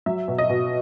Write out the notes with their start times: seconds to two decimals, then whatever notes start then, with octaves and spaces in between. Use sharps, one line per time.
0.06 F#3 E5
0.28 B2
0.38 D#5
0.49 B2